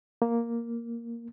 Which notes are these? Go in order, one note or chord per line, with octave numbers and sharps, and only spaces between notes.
A#3